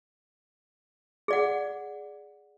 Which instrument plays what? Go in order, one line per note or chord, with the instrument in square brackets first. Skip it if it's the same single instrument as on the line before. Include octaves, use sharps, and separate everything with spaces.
[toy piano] G#4 D5 F#5